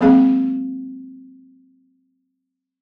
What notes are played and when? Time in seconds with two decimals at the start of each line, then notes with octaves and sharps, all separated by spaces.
0.01 F#3 G#3 A#3 C4 G#4 F5